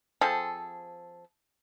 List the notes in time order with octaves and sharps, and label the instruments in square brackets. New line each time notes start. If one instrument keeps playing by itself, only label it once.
[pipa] F3 C4 G#4 A4